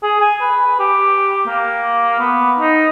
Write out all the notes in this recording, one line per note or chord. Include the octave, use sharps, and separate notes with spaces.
G#4
G#5
B4
G4
A#3
B3
D#4